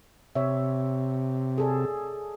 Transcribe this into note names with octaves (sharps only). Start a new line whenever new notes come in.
C3 C#5 E5
G#4 A4 D5